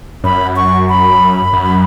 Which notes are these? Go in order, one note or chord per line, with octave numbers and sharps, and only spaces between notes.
F#2 B5
C#6
B5
F#2